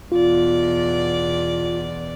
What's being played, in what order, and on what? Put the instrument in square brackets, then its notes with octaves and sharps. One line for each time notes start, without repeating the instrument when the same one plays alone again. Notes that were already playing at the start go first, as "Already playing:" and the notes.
[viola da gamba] E2 B2 D5 [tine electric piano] F4